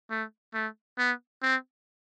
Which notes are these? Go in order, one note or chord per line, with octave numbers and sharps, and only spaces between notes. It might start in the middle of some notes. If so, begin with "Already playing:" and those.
A3
A3
B3
C4